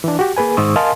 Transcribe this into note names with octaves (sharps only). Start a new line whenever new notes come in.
E3 D4
F#4 G4
A#3 G#4 B4 G#5
G#2 D#3 C5 C#6 D#6 E6
A#4 D#5 F5 G#5 A5 C6